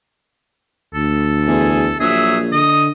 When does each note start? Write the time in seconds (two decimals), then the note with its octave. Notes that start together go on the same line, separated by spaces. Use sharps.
0.94 D2 A4
1.48 E2 G#4
2.00 A#1 F#3 G#4 E5
2.52 D3 D#5 D#6